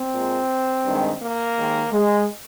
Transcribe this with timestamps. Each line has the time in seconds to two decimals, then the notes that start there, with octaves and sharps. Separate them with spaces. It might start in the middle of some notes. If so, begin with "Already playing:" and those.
Already playing: C4
0.14 A#2 G#3
0.85 G2 D#3 G#3
1.20 A#3
1.57 D#2 D#3 G#3
1.92 G#3